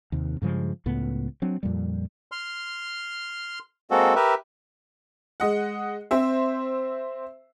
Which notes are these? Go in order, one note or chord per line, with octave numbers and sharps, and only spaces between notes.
D#2 C3
G2 C#3 F3 G#3
C#2 A2 B3
F#3 C4 D4
F2 A#2 G3
C6 F6
G#3 A#3 C4 F#4 A4
G4 A#4 B4 E5
G#3 D#5 F#5
C4 C5 E5